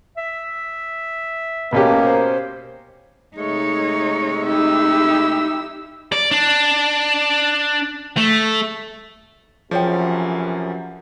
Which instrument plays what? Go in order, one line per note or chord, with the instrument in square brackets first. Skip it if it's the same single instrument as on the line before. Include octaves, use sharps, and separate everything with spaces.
[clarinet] E5
[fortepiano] B2 C#4 G4 [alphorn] A#3
[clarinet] C5
[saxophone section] C3 G#3 A3 [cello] D#4 C#5
[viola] D#4 [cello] E4 G4 [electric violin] E6
[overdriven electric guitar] D5
D4
A3
[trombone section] F#2 C3 E3 [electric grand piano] F3 [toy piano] G#4 C#5 G5